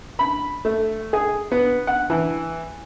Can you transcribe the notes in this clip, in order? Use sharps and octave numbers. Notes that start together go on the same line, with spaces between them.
B5
A3
G#4
B3
F#5
E3